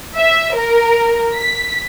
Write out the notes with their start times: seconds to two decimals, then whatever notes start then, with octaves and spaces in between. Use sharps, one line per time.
0.15 E5
0.56 A#4
1.35 B6